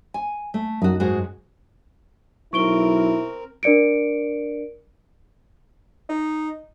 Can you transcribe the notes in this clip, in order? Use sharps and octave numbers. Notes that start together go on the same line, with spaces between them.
G#5
A3
F#2 D#4 F#4
G#2 G#3 F#4
B1 C4 E4 A#4 C#6 D7 G7
D4 A#4 D5 C#7 D7
D#4